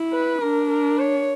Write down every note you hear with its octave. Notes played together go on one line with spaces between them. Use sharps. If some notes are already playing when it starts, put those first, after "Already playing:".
Already playing: E4
B4
D4 A#4
A#4
C#5